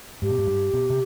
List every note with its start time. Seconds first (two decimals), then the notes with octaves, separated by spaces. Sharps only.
0.22 G#2 G4
0.30 B2
0.38 G#2
0.47 G2
0.73 B2
0.90 C3